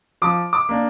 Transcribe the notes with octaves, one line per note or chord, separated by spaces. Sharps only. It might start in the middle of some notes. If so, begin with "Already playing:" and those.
F3 D6
D6
A#3 D4